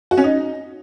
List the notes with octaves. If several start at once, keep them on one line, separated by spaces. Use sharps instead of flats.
F#4
C#4
D#4